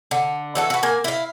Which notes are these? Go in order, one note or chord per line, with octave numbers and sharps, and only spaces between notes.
D3
E3 F#4 A4
F#4 B4
A#3 G#5
E4 F5